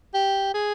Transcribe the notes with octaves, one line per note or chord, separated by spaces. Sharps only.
G4
G#4